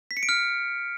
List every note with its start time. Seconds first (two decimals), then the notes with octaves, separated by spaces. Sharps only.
0.11 B6
0.17 C#7
0.23 D7
0.29 F6